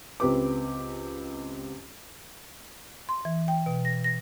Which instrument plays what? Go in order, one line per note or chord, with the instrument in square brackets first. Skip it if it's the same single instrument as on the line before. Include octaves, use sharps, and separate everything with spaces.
[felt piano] C#2 C4 G4 B4 D6
[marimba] C6
E3
G5
B2
A#6
A#6